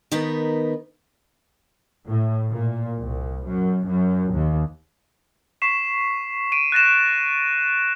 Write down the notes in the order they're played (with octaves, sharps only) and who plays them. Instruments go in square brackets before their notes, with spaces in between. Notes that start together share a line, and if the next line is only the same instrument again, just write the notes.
[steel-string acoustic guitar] D#3 B3 D#4 A#4 B4
[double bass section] A2
A#2
C2
F#2
F#2
D#2
[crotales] C#6 B6 C7 E7
D7 D#7
F#6 A6 A#6 E7